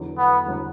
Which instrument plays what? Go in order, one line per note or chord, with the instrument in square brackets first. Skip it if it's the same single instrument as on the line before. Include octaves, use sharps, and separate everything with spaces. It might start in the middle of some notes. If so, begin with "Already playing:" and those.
Already playing: [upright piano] E2 D3 F#3
[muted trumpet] B3
[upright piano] E2 D3 F#3